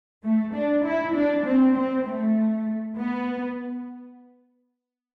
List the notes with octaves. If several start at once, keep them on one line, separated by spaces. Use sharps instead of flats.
A3
D4
E4
D4
C4
C4
A3
B3